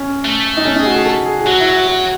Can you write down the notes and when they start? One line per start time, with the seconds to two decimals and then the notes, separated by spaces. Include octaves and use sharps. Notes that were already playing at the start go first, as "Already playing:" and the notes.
Already playing: C#4
0.25 A3
0.57 D#4
0.65 C#4
0.75 D#4
0.80 G#4
0.86 F#4
0.96 G#4
1.05 A4
1.25 G#4
1.41 G#4
1.45 F#3 F#4
1.60 E4
1.72 F#4
1.87 F#4